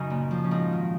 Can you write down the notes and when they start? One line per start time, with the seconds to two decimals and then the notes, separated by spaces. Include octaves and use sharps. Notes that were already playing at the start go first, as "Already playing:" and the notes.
Already playing: F#2 C#3 C#4 D#4
0.10 A#2
0.31 F3
0.44 C#4
0.51 G#2 D#4
0.73 D#3